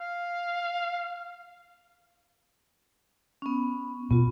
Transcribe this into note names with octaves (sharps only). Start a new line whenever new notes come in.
F5
B3 C#4
B2 B3 F4